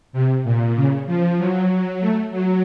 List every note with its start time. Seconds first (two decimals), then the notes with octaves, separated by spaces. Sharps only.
0.13 C3
0.44 A#2
0.76 C#3
1.06 F3
1.38 F#3
2.00 A3
2.31 F#3